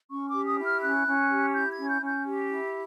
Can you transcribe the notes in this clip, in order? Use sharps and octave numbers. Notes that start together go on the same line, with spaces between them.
C#4 C#6
D6
G4
D#6
E4
F6
C#4 F#6
C#4
G4
E4 G6
G#6
C#4
G6
C#4
G6
G4
E4